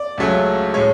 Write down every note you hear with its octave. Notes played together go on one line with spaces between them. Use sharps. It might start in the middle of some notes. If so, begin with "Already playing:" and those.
Already playing: D5
C#2 C#3 F#3 A3
A2 G#3 C#5